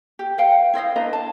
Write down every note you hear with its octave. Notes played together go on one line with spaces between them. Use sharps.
G4
B4 F5 G5
E4 C5 D#5 F5
D4 B4 D#5 A#5
A5